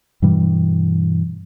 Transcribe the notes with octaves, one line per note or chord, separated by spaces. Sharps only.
G2 B2 E3 G3